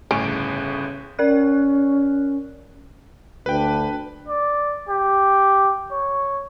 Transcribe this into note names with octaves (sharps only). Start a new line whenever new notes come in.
G1 A2 C#3 C#4 D7
C#4 A#4 D5 F#6
D2 D4 B4 G5
D5
G4
C#5